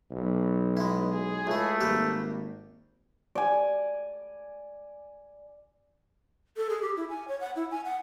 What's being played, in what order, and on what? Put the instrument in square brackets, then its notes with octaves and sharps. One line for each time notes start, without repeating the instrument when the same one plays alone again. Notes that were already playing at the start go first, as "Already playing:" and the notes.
[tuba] B1
[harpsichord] G#3 E4 [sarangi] B3
[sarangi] G#4
[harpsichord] C#2 E4 [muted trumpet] A3
[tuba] G#1 [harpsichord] G3 G4 B4 [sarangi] A#3
[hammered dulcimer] D5 G#5
[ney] A4
G#4
G4
E4
G#5
C#5
F#5
E4
G#5
F#5